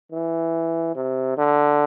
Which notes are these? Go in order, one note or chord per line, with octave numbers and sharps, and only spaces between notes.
E3
C3
D3